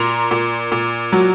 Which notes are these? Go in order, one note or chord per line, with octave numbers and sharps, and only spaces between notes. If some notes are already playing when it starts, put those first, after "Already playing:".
Already playing: A#2 A#5 C6
A#2
A#2
F#3